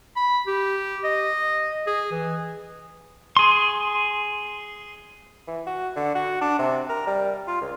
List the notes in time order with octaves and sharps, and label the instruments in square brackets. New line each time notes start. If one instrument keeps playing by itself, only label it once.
[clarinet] B5
G4
D#5
G#4
E3
[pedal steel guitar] G#4 C6
[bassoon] E3
F#4
D3
F#4
D4
C3
A#4
G3
F4
C#2